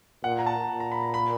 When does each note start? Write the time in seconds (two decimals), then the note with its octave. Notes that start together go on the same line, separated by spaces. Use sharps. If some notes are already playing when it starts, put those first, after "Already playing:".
0.24 A#2 F#5
0.39 A#5
0.46 A5
0.69 A#2
0.80 A#5
0.92 B5
1.03 A#5
1.14 B5